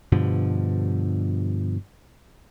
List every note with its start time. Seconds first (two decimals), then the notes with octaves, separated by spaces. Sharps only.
0.12 G2 B2 D3 F3